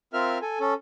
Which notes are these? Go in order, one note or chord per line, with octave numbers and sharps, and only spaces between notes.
C4 F4 A#4 E5 F6
A4 G#5
C#4 A4